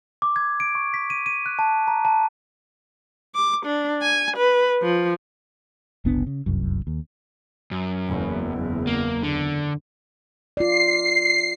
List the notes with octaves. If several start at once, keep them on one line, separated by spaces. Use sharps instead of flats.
D6
G#6
D7
C#6
B6
D#7
D#7
F#6
A5
A#5
A5
D6
D4
G#5
B4
F3
F#1 C2 B3 D4
C#3
F1 C2 F#2
D#2
F#2
F#1 E2
A#3
D3
F4 D5 C7